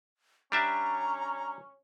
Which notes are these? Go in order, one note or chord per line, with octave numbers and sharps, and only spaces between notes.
G3 C#4 D4 E5 A#5